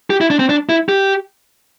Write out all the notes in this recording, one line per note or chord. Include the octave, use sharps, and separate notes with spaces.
G4
E4
D4
C4
D4
E4
G4